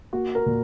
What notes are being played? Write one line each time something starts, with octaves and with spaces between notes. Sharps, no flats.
A#3 F#4
A#4
A#2